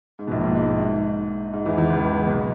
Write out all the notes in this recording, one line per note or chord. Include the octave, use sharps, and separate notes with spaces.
G#2
B2
A#1 A#2
G#2
G#2
G#2
G#2
G#2
E2 E3
E2 E3
C#2 C#3
B1 B2